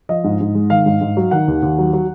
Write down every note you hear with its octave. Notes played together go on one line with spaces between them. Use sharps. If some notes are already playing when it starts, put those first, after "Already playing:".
F3 D#5
G#2
G#2
G#3
D#3 F5
G#2
G#2
F#3
D#3 F#5
D#2
D#2
F#3
F#3